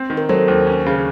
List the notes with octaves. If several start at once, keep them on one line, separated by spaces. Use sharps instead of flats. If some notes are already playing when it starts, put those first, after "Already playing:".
Already playing: C4
D#3
A#4
F#3 A4 C5
D#2
C#4
C#3